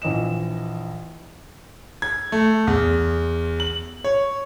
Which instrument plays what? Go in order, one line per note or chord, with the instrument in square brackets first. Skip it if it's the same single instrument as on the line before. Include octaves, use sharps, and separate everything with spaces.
[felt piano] A#1 E3 D#5 E7
[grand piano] G#6
A3
E2
F#7
C#5